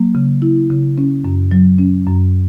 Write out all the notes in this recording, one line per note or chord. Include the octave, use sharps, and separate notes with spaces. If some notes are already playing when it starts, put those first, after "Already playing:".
Already playing: F#3 A#3
C#3
E4
C#3
C#4
F#2
F#3
C#4
F#2